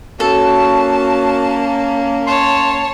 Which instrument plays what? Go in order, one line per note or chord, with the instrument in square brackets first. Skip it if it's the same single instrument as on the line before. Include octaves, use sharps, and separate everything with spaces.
[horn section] A#3 C#4 [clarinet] F#4 [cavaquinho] A4 [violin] A5
[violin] C#5 A5 [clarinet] C6